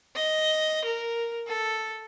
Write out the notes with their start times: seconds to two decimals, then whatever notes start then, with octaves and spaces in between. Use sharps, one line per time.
0.16 D#5
0.85 A#4
1.48 A4